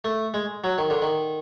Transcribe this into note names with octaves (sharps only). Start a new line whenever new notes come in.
A3
G#3
F#3
D#3
D3
D#3